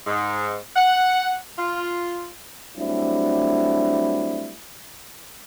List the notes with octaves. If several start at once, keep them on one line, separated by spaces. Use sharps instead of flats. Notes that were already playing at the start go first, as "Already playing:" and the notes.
G#2
F#5
F4
F#3 G3 A3 C4 D4 E4